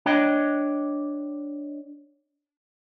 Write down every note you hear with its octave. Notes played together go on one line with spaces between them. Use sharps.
D4 C#5 D#5 G5